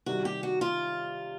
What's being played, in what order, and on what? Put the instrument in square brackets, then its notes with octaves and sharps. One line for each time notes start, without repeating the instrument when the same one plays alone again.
[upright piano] C3 D#3 G3 [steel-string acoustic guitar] F#4
[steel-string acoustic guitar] G4
F#4
F4